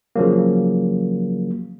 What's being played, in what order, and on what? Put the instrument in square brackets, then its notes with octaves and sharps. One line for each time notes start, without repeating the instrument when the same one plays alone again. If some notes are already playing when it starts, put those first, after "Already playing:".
[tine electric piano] C#3 F3 F#3 A#3